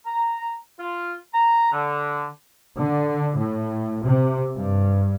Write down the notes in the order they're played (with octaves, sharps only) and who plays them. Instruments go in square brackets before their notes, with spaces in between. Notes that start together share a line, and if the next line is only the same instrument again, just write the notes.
[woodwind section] A#5
F4
A#5
D3
[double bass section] D3
A2
C3
G2